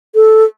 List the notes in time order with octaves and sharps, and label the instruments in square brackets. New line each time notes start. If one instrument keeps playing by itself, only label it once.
[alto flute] A4